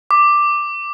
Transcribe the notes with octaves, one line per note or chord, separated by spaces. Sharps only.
D6